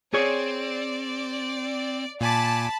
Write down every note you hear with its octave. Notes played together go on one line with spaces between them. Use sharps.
C4 G#4 C#5 D5
A#2 G#5 A5 B5 D6